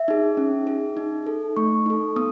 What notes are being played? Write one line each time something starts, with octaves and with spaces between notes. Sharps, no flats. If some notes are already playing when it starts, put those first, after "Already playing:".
Already playing: E5
D#4 G#4
C#4
G#4
D#4
A4
A3 C#6
D#4 A4
B3 D#6